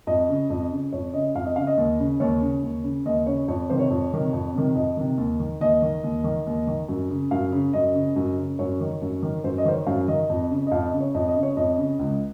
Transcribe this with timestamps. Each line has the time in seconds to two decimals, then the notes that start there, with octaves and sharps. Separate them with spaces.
0.07 F2 D#5
0.29 C#3
0.50 F2
0.71 C#3
0.93 F2 C#5
1.14 C#3 D#5
1.35 F2 F5
1.46 D#5
1.56 C#3 F5
1.67 D#5
1.78 D#2
1.99 C#3
2.20 D#2 C#5
2.41 C#3
2.63 D#2
2.84 C#3
3.06 D#2 D#5
3.27 C#3 C#5
3.48 F2 C#5
3.69 C3 D#3 C5
3.79 C#5
3.90 F2
4.12 C3 D#3
4.33 F2
4.54 C3 D#3
4.75 F2 D#5
4.97 C3 D#3
5.18 D#2
5.39 D#3
5.61 D#2 D#5
5.82 D#3
6.03 D#2
6.24 D#3
6.47 D#2
6.67 D#3
6.88 F#2
7.10 C#3
7.31 F#2 F5
7.52 C#3
7.73 F#2 D#5
7.95 C#3
8.16 F#2
8.38 C#3
8.59 F#2 C#5
8.81 D#3
9.02 F#2
9.23 D#3
9.44 F#2 C5
9.58 D#5
9.65 D#3 C5
9.72 C#5
9.86 F#2 F5
10.08 D#3 D#5
10.30 F2
10.50 C#3
10.67 D#5
10.71 F2 F5
10.86 D#5
10.93 C#3
11.01 C#5
11.14 F2 D#5
11.28 D#5
11.36 C#3
11.43 C#5
11.57 F2 D#5
11.78 C#3
11.99 C#2